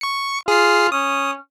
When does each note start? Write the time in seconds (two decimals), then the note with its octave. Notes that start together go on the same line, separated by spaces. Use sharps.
0.01 C#6 C#7
0.48 F4 G#4 C7
0.92 C#4 D#6